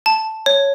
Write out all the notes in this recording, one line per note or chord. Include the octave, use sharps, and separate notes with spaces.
A5
C#5